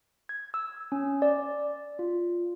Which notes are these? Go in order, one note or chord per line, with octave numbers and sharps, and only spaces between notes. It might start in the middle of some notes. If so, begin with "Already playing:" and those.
G#6
E6
C#4
D5
F4